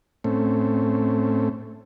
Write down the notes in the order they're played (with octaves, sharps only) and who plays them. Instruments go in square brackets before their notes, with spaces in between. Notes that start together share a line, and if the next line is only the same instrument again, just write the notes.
[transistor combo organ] A2 A3 C4 C#4